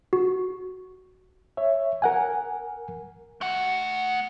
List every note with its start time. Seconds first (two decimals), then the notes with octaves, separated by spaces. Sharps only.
0.13 F#4
1.57 C#5 E5
2.02 A#4 F#5 G#5
3.41 A3 F#5